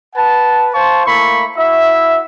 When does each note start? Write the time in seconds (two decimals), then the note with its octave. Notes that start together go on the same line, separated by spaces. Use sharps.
0.14 B4 F#5 A5
0.74 C5 F5 A5 C6 C#6
1.06 A3 A#3 E4 B5 C#6
1.57 E4 F#4 E5